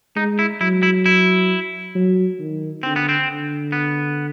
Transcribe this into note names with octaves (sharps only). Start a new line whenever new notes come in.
G#3 D#4
E4
F#3 E4
E4
E4
F#3
D#3
D3 C4
B3
C4
D3
B3